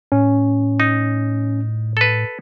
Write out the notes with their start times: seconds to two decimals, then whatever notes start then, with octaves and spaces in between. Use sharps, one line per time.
0.12 A2 C#4
0.80 D#4
1.97 A4 B4